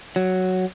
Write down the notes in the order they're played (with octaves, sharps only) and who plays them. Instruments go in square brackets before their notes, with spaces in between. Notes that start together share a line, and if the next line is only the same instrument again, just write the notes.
[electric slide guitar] F#3